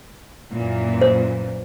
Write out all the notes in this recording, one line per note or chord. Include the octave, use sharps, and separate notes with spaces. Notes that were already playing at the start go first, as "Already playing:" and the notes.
F#2 A#2 E3
C5